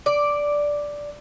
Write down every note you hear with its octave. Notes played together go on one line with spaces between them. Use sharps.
D5